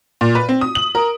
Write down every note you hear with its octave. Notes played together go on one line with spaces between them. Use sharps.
A#2
B4
C4
D#6
F#7
A#4